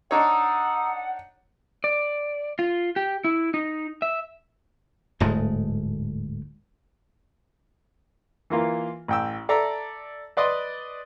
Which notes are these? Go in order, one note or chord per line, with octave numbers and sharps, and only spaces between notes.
D4 D#4 C#5 F#5 A#5 D#6 E6
D5
F4
G4
E4
D#4
E5
D1 G#2 G#3 A3
E3 A#3 F4
A1 G5 E6
A4 D5 E5 A#5
B4 D5 D#5 C6